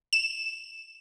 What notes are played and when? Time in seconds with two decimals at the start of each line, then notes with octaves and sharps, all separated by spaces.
0.13 E7